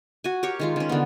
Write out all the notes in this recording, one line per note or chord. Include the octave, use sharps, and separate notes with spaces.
F#4 G#5
G4 A#4 C#5 C#6
D#3 G#3 F4
D#3 C#4
D3 B3